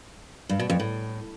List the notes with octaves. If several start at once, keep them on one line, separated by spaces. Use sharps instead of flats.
G2
B2
F2
A2